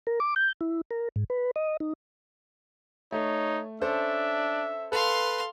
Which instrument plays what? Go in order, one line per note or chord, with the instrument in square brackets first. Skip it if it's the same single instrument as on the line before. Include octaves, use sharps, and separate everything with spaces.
[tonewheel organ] A#4
D6
G6
E4
A#4
G#2
B4
D#5
D#4
[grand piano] A3 [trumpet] D#4 [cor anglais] C#5
[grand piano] C#4 A4 C5 [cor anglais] D4 [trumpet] E5
[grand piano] A4 [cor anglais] B4 [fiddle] F5 C6